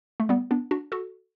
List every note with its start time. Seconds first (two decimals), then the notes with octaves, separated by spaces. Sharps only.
0.20 A3
0.29 G3 B3
0.51 B3 D4
0.71 D4 F#4
0.92 F#4 A4